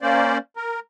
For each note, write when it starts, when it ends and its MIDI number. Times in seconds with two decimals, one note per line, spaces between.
0.01 0.38 58
0.01 0.38 61
0.01 0.38 72
0.01 0.38 74
0.57 0.80 70